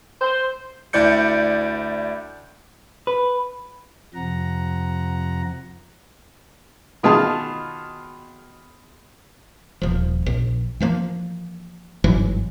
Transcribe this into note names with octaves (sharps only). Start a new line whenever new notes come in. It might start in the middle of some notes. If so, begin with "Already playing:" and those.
C5
D2 E4 D5 G6 C#7
B4
F2 C3 F3 F#5 A#5
B2 D#3 F4 G#4 F5 A5
D#1 F3
A#1
E3 F3 A3 A#3
G1 G#2 E3 F#3